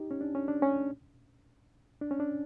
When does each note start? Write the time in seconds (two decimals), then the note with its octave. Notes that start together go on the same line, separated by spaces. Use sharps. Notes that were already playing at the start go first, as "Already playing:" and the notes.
Already playing: D#4 G4
0.11 C#4
0.21 D4
0.35 C#4
0.48 D4
0.62 C#4
2.01 D4
2.11 C#4
2.20 D4